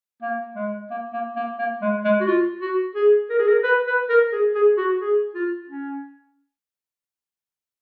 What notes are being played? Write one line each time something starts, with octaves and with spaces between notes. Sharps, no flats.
A#3
G#3
A#3
A#3
A#3
A#3
G#3
G#3
F#4
F4
F#4
G#4
A#4
G#4
A#4
B4
B4
A#4
G#4
G#4
F#4
G#4
F4
C#4